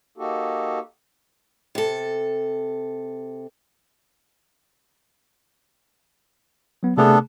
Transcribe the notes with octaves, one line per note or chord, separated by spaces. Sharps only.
A#3 D#4 F#4 G4 A4
C3 A4
F#3 B3
C3 A3 B3 D4 G#4 A4